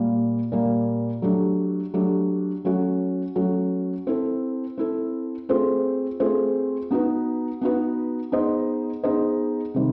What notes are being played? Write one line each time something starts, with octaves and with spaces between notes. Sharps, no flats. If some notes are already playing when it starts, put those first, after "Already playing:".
Already playing: A#2 G3 A#3
A#2 G3 A#3
F#3 A3 D4 G4
F#3 A3 D4 G4
F#3 A3 C#4 F#4
F#3 A3 C#4 F#4
C4 E4 A4
C4 E4 A4
A3 C4 F4 G#4 C5
A3 C4 F4 G#4 C5
B3 D#4 F#4 B4
B3 D#4 F#4 B4
B3 D#4 G#4 C5 D#5
B3 D#4 G#4 C5 D#5
C3 D#3 G3 C4